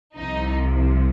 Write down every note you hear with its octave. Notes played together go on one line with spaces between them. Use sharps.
C2 C3 F3 D#4